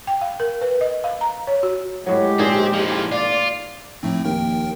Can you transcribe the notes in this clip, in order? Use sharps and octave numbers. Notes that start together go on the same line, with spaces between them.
G5
F5
A#4
B4
D#5
F5
A#5
C#5
F#4
A2 F#3 G#3 G4
A#2 C4 D4 D#4 G#4
A2 F3
F4 D5
A2 F3 A3 C4 D#4
D#2 A#4 G5